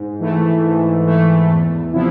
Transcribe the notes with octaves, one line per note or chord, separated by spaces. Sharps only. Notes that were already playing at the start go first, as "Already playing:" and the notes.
Already playing: G#2
E3 A3
G#2
E3 A3
E2
C3 F3 B3 E4